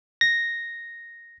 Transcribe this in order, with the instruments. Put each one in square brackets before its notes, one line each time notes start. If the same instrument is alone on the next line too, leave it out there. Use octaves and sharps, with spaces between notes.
[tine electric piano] A#6